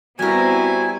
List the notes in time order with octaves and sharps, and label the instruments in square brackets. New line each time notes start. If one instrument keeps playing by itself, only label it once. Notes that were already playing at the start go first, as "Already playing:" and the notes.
[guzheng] G3 A#4 [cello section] B3 C4 E4 [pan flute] F#4 [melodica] G#5